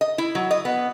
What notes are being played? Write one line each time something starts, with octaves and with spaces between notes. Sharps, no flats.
D#5
E4
F#3
D#5
B3